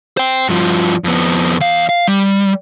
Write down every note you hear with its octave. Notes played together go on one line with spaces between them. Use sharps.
C5 G5
G2 F3
F2 B3
E2 F5
F5
G3